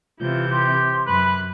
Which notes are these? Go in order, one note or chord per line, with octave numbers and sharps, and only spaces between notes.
C3 E3 F4 G6
G4 C6
F#2 B4 B5 F#6